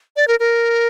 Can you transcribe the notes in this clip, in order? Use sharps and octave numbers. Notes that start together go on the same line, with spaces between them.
D5
A#4
A#4